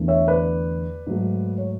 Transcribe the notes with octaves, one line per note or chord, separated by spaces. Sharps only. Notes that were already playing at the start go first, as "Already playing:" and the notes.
Already playing: E2 D3 A3
C#5 E5
B4 D5
G#2 F#3 A3
C#5